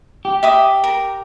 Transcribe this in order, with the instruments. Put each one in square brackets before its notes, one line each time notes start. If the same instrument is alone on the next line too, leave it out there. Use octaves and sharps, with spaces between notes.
[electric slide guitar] G4
[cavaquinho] E5 D6 D#6
A#4